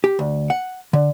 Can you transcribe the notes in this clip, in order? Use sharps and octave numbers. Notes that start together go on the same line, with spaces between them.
G4
D2
F#5
D3